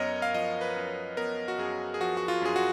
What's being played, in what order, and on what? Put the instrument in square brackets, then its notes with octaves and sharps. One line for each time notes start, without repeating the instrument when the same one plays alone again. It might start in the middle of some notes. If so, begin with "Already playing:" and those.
Already playing: [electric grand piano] F#2 B3 A#4 C#5 D#5
F5
F3 D#5
B4
F#2
B3 A#4
F#4
F#2 G#4
G#4
F3 F#4
F#4
F4
F#2 G#4
F#4